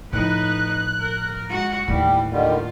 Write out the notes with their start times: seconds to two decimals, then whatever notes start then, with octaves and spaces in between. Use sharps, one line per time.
0.13 A2 F3 D#4 B4 F#6
1.00 A#4
1.49 G#3 F#4
1.88 D#2 A2 E3 G3
2.32 D3 D#3 G3 F4